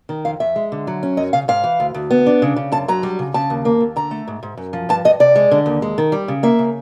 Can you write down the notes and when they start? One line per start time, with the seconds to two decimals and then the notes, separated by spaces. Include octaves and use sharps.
0.09 D#3
0.25 F2 F5
0.40 F2 E5
0.56 G#3
0.72 D3
0.87 F#3
1.03 C#4
1.17 F#2 D#5
1.33 C#3 F5
1.48 G#2 F5
1.64 E3
1.80 D2
1.94 D2
2.11 B3
2.26 D4
2.42 C#3
2.56 C#3
2.72 F#2 A5
2.88 F#3 A#5
3.03 G3
3.19 C#3
3.34 C#3 A5
3.50 D#2
3.65 A#3
3.81 D#2
3.96 D3 A#5
4.11 A3
4.28 G#2
4.43 G#2
4.57 F#2
4.73 F3
4.89 G2 A5
5.05 G2 D#5
5.20 C3 D5
5.36 G#3
5.51 D3
5.66 D#2
5.82 G#3
5.98 D#3
6.12 G3
6.28 C#3
6.43 A#3 E5
6.59 C#3